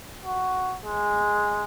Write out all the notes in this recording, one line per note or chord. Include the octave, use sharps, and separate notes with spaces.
F#4
G#3